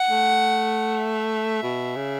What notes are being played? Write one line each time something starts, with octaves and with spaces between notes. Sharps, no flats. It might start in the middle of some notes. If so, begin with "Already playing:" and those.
Already playing: F#5
A3
E5
B2
C#3